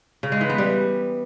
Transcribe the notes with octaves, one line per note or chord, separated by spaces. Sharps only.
C#3
G#3
E3
B3
G3